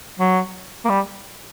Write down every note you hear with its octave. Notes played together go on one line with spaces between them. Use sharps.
F#3
A#3
G3